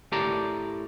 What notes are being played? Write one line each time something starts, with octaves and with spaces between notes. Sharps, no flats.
A2 G4 A#4 D5 A5 A#5